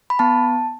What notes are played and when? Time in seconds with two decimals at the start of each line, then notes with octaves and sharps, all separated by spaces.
0.10 B5
0.19 B3 A5